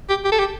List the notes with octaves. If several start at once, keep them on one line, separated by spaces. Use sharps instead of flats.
G4
G4
A4
G4